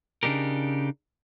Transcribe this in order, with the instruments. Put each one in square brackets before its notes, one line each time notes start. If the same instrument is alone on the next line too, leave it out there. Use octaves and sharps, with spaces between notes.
[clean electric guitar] C#3 D4 D#4 G4 A#4